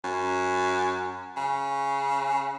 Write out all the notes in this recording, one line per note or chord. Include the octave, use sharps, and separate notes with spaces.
F#2
C#3